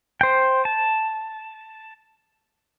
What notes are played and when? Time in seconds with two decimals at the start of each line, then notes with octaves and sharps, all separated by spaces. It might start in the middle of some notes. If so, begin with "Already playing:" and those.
0.21 C5 G5
0.65 A5